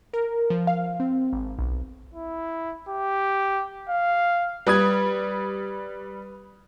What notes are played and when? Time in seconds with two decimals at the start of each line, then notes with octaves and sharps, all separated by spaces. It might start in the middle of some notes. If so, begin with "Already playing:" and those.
0.13 A#4
0.50 F3
0.67 F5
1.00 C4
1.33 G#1
1.59 B1
2.14 E4
2.89 G4
3.90 F5
4.67 G3 B4 D#6 G#6